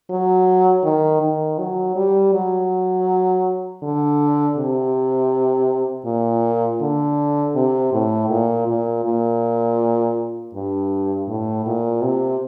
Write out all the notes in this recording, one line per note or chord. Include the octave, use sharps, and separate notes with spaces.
F#3
D#3
D#3
F#3
G3
F#3
D3
C3
A#2
D3
C3
A2
A#2
A#2
A#2
G2
A2
A#2
C3